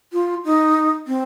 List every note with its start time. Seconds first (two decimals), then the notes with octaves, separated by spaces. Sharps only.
0.13 F4
0.45 D#4
1.07 C4